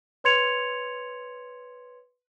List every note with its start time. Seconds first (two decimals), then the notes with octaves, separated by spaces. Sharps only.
0.24 B4 C#5 C6 G#6 C#7 F7